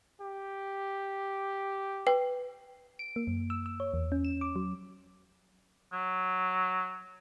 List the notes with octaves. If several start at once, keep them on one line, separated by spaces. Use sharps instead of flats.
G4
B4 G5
D7
A#3
F#2
E6
E6
C#5
E2
C#4
E7
D6
F#3
F#3